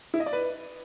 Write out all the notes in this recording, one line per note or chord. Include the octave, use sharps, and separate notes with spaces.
E4
D#5
D5
B4